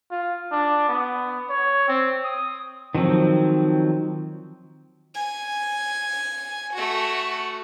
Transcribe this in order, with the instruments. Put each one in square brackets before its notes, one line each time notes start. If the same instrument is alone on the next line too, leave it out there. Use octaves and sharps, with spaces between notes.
[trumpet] F4
D4
B3
C#5
C4
D#6
[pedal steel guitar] D#3 F3 F#3 C4
[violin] G#5
A3 F#4